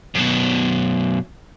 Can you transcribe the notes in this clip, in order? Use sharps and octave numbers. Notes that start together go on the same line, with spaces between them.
F#2 B2